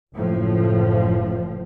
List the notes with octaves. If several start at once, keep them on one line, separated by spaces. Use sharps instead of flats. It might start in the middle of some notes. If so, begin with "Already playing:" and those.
F#1 A2 F3